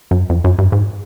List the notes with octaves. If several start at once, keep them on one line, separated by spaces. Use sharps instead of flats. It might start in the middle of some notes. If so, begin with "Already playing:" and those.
F#2
F2
F#2
G2
G#2